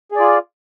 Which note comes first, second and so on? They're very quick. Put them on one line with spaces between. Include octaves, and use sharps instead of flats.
G#4 D5 F4